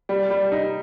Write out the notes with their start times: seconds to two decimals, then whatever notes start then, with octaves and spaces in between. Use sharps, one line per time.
0.09 G3
0.30 G3
0.52 D#4